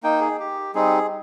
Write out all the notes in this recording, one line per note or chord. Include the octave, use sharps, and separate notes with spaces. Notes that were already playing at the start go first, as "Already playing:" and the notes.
A#3 D#4 G5
G#4
G4
G3 C4 D#4 G#4